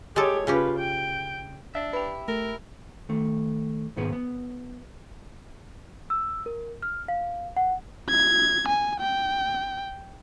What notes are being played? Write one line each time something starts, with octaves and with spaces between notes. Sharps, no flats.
G#3 G4 A4 C#5
C#3 C#4 F4 G4 B4
G5
D4 E5
E4 G4 B4
A3 A#4
D#3 A3
B1 G#2 D#3 B3 G#4 B4
B3
E6
A#4
F6
F5
F#5
G#6
G#5
G5